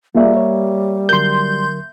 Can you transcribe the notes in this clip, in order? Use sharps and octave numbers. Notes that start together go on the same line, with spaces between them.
G3 A#3 F4 G#4 D5 E5
C#5
D3 F#3 A#4 C6 G6